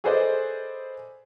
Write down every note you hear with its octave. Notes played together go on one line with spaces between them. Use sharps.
G#4 A4 B4 C5 D5 D#5